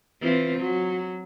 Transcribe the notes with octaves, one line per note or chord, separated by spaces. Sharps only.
E3 C4 F4
F#3